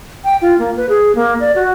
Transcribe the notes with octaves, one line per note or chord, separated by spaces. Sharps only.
G5
F4
A#3
B4
G#4
A#3
D5
F#4